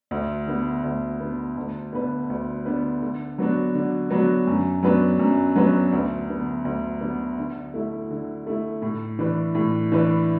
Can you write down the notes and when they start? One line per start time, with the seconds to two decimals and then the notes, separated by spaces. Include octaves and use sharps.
0.11 D2
0.47 D3 B3
0.84 D2
1.21 D3 B3
1.57 D2
1.93 D3 B3 D4 B4
2.30 D2
2.65 D3 B3 D4 B4
3.02 D3
3.38 F#3 B3 D4 F#4
3.75 D3
4.10 F#3 B3 D4 F#4
4.47 F#2
4.83 F#3 B3 D4 B4
5.19 F#2
5.56 F#3 B3 D4 B4
5.92 D2
6.28 D3 B3
6.65 D2
7.01 D3 B3
7.38 D3
7.74 A3 E4
8.11 D3
8.47 A3 E4
8.82 A2
9.19 E3 D4 B4
9.55 A2
9.92 E3 D4 B4